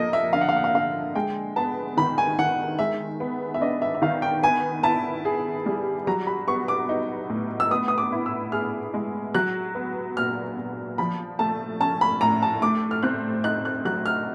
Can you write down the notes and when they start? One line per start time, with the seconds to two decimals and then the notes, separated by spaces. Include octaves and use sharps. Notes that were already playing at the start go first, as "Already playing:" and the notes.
Already playing: F3 A#3 A4 D#5
0.13 E5
0.33 D3 F5
0.41 F#5
0.49 F5
0.56 F#5
0.64 F5
0.74 D3 F5
1.15 G#3 G5
1.56 B3 A5
1.97 D#3 B5
2.18 G#5
2.39 D#3 F#5
2.79 G#3 E5
3.20 B3
3.54 E5
3.61 D4 D#5
3.82 E5
3.95 E5
4.02 D#3 F5
4.22 G5
4.43 B3 G#5
4.83 E4 A5
5.25 G#4
5.66 G3
6.07 F#3 A#5
6.27 B5
6.48 B3 C#6
6.68 D6
6.89 D#4
7.30 A2
7.60 E6
7.71 B3 D#6
7.88 D#6
7.98 D6
8.12 E4
8.26 E6
8.52 G#4 F6
8.94 G#3
9.34 F#3 F#6
9.75 B3
10.17 A#2 F6
10.57 A#2
10.98 F3 B5
11.39 A3 A5
11.80 C#4 A5
12.01 B5
12.21 A2 A#5
12.42 A5
12.62 A3 D6
12.91 F6
13.03 C4 F#6
13.44 D#4 F#6
13.65 F#6
13.85 F#3 F#6
14.06 F6